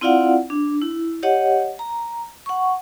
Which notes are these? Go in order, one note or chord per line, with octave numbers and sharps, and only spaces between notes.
C4 E4 F4 D5 F5 F#5
D4
E4
G4 C#5 D#5 F#5
A#5
F#5 C#6